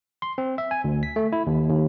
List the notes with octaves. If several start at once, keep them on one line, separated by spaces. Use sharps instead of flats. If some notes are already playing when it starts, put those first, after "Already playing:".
C6
C4
E5
G#5
D2
B6
A3
E4
D#2
D#2